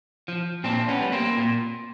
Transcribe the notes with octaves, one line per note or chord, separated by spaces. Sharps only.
F3
A#2 C4 D4
B3 C#4
G3
A#3 C4
A#2